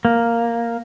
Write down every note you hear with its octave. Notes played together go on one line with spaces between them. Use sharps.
A#3